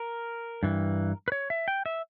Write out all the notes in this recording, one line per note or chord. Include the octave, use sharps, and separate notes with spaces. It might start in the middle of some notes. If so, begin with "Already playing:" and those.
Already playing: A#4
G2 E3
B4
C#5
E5
G5
E5